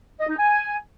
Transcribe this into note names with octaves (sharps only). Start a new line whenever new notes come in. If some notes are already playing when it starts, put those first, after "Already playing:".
D#5
D#4
G#5